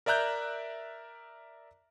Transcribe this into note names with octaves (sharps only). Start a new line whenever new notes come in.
A#4 D5 E5 A#5 F#6 G6